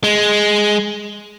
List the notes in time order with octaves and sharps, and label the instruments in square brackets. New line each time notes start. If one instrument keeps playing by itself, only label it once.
[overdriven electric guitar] G#3